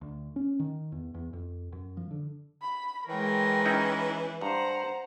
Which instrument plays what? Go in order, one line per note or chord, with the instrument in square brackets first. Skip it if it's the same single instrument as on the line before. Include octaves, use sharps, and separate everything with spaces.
[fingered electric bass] D2
C#4
D#3
E2
E2
F2
F#2
F3
D3
[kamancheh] B5
[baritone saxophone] E3 [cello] G#3 A#4 [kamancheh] C#5 G5
[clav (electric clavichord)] C#4 D#4 E4
[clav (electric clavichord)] G2 [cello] C5 F#5 [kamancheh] A#5